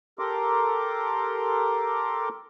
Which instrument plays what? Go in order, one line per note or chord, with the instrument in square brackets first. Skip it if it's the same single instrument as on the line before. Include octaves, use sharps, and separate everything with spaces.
[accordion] G4 A4 A#4 A#5 C6 D6